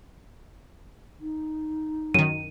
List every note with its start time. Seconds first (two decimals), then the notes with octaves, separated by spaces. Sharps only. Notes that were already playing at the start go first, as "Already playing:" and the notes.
1.20 D#4
2.14 F#2 D#3 D#7